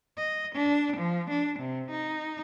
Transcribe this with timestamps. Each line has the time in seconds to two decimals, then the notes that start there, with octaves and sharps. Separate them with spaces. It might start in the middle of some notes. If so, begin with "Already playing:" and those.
0.17 D#5
0.55 D4
0.97 F3
1.30 D4
1.59 C3
1.91 D#4